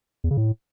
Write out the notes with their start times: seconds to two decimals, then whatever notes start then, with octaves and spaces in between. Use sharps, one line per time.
0.24 E2
0.31 C#3
0.37 A2